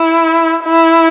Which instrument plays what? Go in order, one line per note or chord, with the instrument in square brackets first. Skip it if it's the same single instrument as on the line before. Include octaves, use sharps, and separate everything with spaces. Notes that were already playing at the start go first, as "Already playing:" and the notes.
Already playing: [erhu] E4
E4